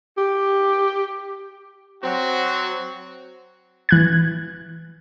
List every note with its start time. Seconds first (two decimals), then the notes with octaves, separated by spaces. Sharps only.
0.18 G4
2.04 F#3 C4 F#4
3.89 E3 F#6 G#6